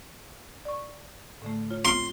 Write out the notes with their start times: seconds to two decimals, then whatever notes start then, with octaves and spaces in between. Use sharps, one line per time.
0.65 D5 C#6
1.42 A2 D3 A3
1.71 F4 C#5
1.85 C4 F4 C6